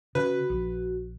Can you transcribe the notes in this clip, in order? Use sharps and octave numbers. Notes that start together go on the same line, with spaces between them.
C#3 F#4 B4
A#1